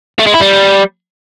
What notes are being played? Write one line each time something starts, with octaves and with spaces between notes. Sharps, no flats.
A3
G#3
E4
G3